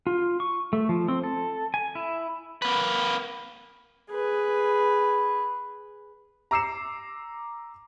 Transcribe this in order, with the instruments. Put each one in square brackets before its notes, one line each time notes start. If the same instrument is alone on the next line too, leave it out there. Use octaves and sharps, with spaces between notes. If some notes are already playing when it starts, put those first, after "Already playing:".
[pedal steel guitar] F4
C#6
A3
F3
C4
A4
G#5
E4
[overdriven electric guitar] A#3 B4
[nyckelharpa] G#4 B4
[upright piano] A#5 D6 E6 C7 C#7 E7